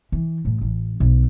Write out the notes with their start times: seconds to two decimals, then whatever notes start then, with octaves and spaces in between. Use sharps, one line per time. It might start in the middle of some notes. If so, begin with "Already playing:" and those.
0.12 E3
0.45 A2
0.61 A1
1.00 B1